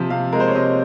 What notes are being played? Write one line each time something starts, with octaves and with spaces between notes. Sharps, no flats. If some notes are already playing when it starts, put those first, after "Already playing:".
Already playing: C3 F3
C3 F5
G#3 A#4
C5
C#5
C3 D#5